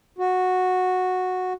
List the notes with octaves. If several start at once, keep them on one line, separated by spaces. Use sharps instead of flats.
F#4